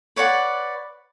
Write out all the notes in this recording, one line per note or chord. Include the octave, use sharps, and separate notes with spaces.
B4 C#5 D5 F#5